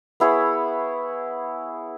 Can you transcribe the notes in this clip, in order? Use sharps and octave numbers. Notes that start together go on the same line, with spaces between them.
B3 E4 G#4 C#5